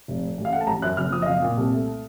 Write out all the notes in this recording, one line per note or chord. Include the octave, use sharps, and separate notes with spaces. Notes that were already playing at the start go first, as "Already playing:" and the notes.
F1
A2
A1
F5
A3 F#5
A5
A1 A#5
F#2 F#6
F#1 F6
F3 D#6
D#5
F#1 F5
A#2
C2
A3